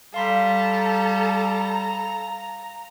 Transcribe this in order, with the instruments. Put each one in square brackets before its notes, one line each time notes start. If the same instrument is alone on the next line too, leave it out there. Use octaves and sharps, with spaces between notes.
[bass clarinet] G3 [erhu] A4 [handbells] F5 C6 B6 [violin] A#5